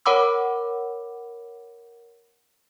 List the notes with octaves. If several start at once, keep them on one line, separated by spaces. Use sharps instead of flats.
A#4 C#5 F#5 B5 D6 E6